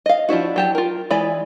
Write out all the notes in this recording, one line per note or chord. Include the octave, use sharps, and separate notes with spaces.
D#5 F5
F3 D4 E4 F#4
F#3 G4 A5
F4 A#4
E3 G#3 D5 B5